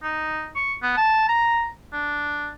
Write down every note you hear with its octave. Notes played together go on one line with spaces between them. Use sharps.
D#4
C#6
B3
A5
A#5
D4